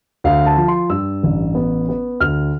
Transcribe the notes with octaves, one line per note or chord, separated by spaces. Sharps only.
D2 F5
A5
F3
C6
G2 E6
A1
B3
B3
D2 F6